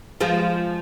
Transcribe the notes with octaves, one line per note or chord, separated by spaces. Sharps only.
F3 G#3